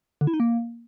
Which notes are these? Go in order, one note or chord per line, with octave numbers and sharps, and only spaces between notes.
D3
E4
D#4
A#3